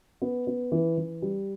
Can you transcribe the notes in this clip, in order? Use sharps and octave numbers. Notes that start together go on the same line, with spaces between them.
B3
B3
E3
E3
G3